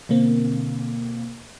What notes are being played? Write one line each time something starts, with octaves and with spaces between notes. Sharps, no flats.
B2 D3 A#3 C4